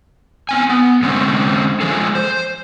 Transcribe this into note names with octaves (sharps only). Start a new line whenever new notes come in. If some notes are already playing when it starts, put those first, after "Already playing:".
B3 C4 G#5
B3
D3 G#3 A#3 C4 C#4
F3 G#3 G#4 A4
C5